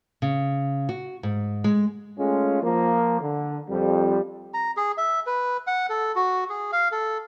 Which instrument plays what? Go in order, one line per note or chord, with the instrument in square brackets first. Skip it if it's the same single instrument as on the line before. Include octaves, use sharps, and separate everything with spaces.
[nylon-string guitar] C#3
F#4
G#2
G#3
[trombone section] G#3 A3 C#4 F4
F3 A#3
D3
F2 G3
[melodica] A#5
G#4
E5
B4
F#5
A4
F#4
G#4
F5
A4